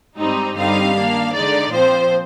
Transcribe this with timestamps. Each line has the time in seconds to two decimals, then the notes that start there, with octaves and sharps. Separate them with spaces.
0.18 G#2 G3 C4 D#4
0.57 G2 D3 G3 C4 D#4 F5
0.95 D#3 A#3 D4
1.33 D3 G#3 D#4 D5
1.71 A#2 F3 C4 C5